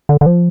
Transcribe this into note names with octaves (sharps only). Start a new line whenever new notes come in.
D3
D3
F3